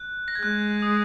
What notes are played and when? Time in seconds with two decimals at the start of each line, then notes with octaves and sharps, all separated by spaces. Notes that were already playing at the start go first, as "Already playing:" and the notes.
Already playing: F#6
0.28 A#6
0.35 G#6
0.42 G#3 F#6
0.82 D#6